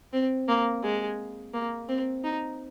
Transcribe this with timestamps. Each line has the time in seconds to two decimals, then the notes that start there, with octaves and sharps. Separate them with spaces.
0.13 C4
0.48 A#3
0.83 G#3
1.53 A#3
1.88 C4
2.24 D#4